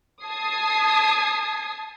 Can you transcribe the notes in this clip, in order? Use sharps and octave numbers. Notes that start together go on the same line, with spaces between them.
A5 D#6 G#6 C7